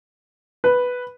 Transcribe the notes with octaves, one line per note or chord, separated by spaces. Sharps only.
B4